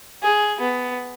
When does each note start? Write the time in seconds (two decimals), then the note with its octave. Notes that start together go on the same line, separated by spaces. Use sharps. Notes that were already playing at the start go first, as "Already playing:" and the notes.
0.23 G#4
0.60 B3